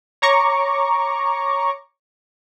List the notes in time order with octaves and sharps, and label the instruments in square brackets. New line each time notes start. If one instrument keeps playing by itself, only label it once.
[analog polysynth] C#5 A#5 C#6 D6